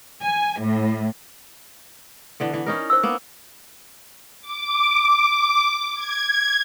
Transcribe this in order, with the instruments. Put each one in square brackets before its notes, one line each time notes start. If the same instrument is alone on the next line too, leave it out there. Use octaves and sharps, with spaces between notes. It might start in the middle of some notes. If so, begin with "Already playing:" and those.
[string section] G#5
A2
[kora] D3 E3 B3
E3
C#4 D#4 A#4
[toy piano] C5 E6
[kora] A#3 B3
[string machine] D6
G#6